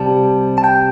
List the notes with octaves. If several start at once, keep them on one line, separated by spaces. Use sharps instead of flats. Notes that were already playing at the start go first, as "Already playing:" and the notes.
Already playing: C2 C3 G3 A5
A5
G5